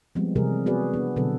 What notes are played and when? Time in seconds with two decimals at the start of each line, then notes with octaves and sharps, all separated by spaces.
0.15 F3 G3 G#3 B3 C4
0.36 C3 E3 G3 G#4 A#4
0.66 B3 F#4 G#4 B4 D5
0.94 B3 D4
1.16 B2 D3 F#3 C4 A4 B4